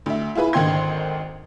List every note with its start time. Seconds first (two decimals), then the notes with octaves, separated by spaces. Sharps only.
0.06 D2 E5
0.35 E4 F4 G#4 B4 B5
0.53 G#1 D3 D#3 G5 C6 G#6